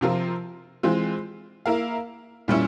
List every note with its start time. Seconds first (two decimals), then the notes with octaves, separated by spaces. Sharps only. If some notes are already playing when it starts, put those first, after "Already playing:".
0.01 C3 F3 C4 F4 A#4
0.83 E3 G#3 C4 F4
1.66 A#3 E4 A#4 F5
2.48 A#2 G3 C#4 E4